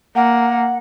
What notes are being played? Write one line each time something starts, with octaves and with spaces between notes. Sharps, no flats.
A#3 F#5